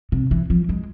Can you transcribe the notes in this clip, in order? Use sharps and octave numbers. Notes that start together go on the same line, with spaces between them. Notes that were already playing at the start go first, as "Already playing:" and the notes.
C3
E3
F3
G#3